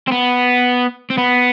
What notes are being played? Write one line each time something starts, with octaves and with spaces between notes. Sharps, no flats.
C4
B3
C4
B3